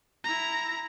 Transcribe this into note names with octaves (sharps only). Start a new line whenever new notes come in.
E4 A#5